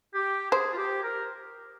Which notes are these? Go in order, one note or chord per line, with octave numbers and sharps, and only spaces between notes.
G4
G#4 C5
F4
G4
A#4